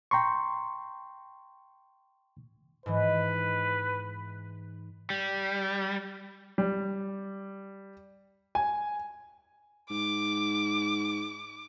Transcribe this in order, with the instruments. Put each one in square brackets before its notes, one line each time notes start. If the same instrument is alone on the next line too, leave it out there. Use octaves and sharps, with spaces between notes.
[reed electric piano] G5 A#5 C6 C#6
[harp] G#2 E3 [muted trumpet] B4
[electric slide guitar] G3
[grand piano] G3
G#5
[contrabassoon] G#2 [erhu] D6